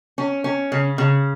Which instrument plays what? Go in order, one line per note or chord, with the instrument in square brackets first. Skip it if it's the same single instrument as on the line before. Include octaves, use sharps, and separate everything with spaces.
[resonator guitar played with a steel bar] C#4
C#4
C#3
C#3